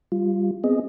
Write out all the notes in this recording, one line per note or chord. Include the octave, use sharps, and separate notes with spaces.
G3 F4
B3 C4 G#4 D#5